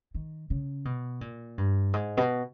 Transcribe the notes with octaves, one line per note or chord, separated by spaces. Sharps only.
D#3
C#3
B2
A#2
G2
G#2
B2